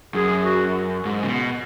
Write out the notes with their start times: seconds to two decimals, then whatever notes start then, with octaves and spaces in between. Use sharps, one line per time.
0.15 F#2 G#4
0.45 F#4
1.05 G#2
1.23 C#3
1.28 B2